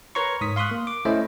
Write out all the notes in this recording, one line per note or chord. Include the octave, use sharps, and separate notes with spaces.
A#4 B4 C#5 A#5 C6 C#6
G#2 D#6 B6
F5 C6 C#6 D#6 F#6
A#3
D6
A3 C#4 E4 C5 D#5 E5